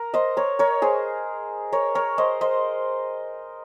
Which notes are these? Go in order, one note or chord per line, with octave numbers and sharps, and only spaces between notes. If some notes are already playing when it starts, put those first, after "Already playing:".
Already playing: A#4
C5 D#5
A#4 C#5
A#4 C#5
G#4 C5
A#4 C#5
A#4 C#5
C5 D#5
C5 D#5